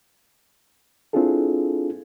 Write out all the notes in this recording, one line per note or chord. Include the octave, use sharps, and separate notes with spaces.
C4 D4 E4 F4 G#4 A4